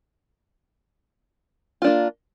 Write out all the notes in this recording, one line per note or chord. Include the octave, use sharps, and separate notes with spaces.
A#3 D4 F4